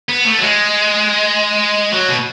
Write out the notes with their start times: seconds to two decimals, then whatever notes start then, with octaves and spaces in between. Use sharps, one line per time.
0.09 B3
0.25 A3
0.38 F#3
0.41 G#3
1.92 F#3
2.08 B2